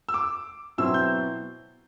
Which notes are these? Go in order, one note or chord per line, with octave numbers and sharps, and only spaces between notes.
E6
D6
B2 F#3 C4 E4 E6
G6